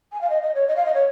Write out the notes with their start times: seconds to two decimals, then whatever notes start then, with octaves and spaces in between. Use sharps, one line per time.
0.12 G#5
0.21 F5
0.30 D#5
0.42 D#5
0.55 C#5
0.68 D#5
0.76 F5
0.86 D#5
0.94 C#5